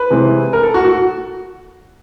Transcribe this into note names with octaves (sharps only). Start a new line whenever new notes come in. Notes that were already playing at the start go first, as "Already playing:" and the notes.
Already playing: B4
C3 E3 G#3 C4 E4
A#4
A4
F#4
F#4